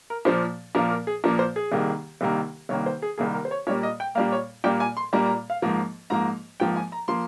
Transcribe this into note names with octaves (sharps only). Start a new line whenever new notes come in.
A#4
A#2 F3 A#3 C5
A#2 F3 A#3 A#4
A#4
G#4
A#2 F3 A#3 A#4
C5
G#4
C2 C3 D#3 A#3
C2 C3 D#3 A#3
C2 C3 D#3 A#3 C#5
C5
G#4
C2 C3 D#3 A#3 G#4
A#4
C5
C#5
A#2 G3 A#3 C#5
D#5
G5
A#2 G3 A#3 F5
C#5
A#2 G3 A#3 G5
G#5
C6
A#2 G3 A#3 A#5
A#5
F5
G#2 F3 A#3
G#2 F3 A#3 A#5
G#2 F3 A#3 G5
G#5
A#5
F3 A#3 C6